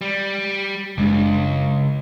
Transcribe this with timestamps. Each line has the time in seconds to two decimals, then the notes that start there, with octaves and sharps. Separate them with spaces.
0.01 G3
0.98 F#1 C#2 G#3 D4